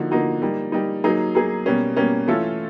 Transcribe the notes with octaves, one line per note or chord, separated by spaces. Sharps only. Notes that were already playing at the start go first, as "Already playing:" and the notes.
Already playing: D3 F3 A#3 D#4 F#4
D3 F3 A#3 D#4 F#4
G3 A#3 D#4
G3 A#3 D#4
F#3 A#3 D#4 G#4
F#3 A#3 D#4 G#4
B2 G3 A#3 C#4
B2 G3 A#3 C#4
E3 A3 C#4 F4 A4